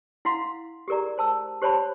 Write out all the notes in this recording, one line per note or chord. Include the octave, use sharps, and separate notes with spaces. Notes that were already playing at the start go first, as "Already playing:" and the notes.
E4 F5 F#5 C6
G4 G#4 A#4 D5 A#5
C5 A5 E6
G4 C5 C#5 A5 B5